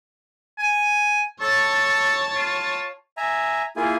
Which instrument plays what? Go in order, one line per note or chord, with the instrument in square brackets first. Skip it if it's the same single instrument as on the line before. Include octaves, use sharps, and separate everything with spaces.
[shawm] G#5
[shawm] A4 [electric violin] C#5 A5
[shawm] F4
[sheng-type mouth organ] E5 G#5 A#5
A#3 E4 F4 G#4 G#5